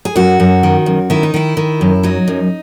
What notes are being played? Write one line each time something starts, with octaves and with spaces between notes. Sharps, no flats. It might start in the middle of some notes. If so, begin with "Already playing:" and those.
G#4
F#2 F#4
F#2
D#3
F#2
D#3 E4
D#4
D#3 E4
D#3
F#2
F#3 D#4
F#2